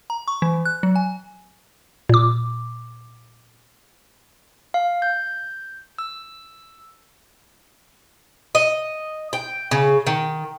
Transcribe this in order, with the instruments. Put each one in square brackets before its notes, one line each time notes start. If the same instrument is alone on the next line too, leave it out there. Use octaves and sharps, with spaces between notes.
[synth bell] A#5
C#6
E3
F#6
F#3
G#5
[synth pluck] A#2 D6
[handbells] F5
G6
E6
[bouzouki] D#5
G5
C#3
D#3